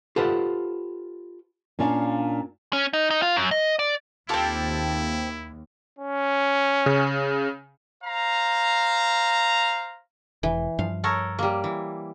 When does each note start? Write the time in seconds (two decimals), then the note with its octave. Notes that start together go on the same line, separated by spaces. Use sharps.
0.16 F4 G4 A4 B4 C5 F#5
1.79 A#2 C#4 D4 D5 F5
2.73 C#4
2.93 D#4
3.10 D#4
3.22 F4
3.36 F#2
3.51 D#5
3.79 D5
4.29 D#2 C4 E4 F4 G4 A4 A5
5.99 C#4
6.86 C#3
8.04 C5 F5 A#5
10.43 E1 E3
10.79 G2 F3 F5
11.04 A4 A#4 C#5
11.39 G3 A#3
11.64 E3